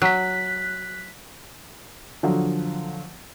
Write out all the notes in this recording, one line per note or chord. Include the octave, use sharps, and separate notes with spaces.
F#3 F#6 B6
D3 F3 F#3